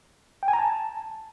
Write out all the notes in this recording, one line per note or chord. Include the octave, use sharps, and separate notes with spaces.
G5
G#5
A#5
A5